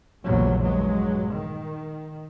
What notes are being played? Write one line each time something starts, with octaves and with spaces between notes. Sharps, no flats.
A#1 E2 A#2 C#3 F#3 G3
G2 F#3 G#3
D#3